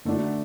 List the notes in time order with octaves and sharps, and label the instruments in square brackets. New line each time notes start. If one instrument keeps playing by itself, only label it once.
[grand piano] D3 A3 D4 F#4